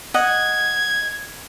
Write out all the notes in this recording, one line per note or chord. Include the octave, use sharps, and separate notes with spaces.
D#5 F#5 G#6